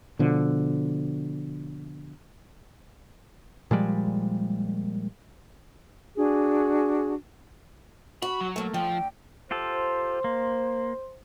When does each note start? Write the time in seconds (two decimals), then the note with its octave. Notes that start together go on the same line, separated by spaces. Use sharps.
0.19 B2 D3 F3
3.71 A#2 F3 G3 G#3
6.16 D4 F#4 G#4
8.22 F#4 B5
8.41 F#3
8.56 A3 A#3
8.74 D3 F3 G5
9.51 F4 G4 A4 C5
10.24 A#3